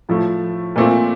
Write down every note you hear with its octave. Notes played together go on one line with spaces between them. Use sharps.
A2 F3 A3
A#2 A3 C4 F4